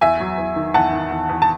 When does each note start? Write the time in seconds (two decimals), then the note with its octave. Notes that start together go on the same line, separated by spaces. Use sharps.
0.01 E2 E5 G#5
0.20 F#3
0.38 E2
0.56 D#3
0.74 E2 F#5 A5
0.93 D#3
1.11 E2
1.29 E2
1.42 A5